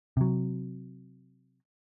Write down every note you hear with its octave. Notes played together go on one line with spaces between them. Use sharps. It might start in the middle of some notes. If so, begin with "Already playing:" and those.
C3 F#3